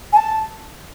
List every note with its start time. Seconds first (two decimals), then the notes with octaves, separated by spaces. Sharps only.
0.13 G#5
0.17 A5